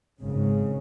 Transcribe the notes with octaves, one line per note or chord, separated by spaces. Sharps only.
G#1 G#2 C#3